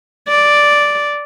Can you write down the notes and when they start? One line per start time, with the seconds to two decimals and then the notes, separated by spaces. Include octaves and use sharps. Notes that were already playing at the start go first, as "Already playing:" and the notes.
0.28 D5